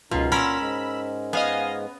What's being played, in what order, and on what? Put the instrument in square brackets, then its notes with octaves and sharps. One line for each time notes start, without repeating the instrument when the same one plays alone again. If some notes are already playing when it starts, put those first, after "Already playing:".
[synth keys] C#2 F4 [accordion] F#2 D#4 [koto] B2
[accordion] A#2 C6 [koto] C#4 A#4 [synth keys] B5 E6
[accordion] G#2 G#3
[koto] B3 [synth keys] D#5 F5 G#5